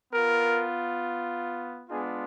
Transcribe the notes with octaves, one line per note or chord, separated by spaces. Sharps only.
B3 F4 A#4
G#3 B3 D4 F4 G#4